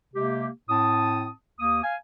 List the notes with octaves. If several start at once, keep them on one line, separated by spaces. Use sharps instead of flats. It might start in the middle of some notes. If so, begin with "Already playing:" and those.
C3 G#3 A#3 G4
A2 C4 A5 D#6
D#2 A#3 D#6
F5 G#5